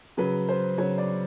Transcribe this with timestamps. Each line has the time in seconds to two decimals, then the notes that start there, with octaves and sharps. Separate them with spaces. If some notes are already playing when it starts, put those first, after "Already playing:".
0.17 C#3 F#3 B4
0.48 C5
0.78 C#3 F#3 C#5
0.98 D5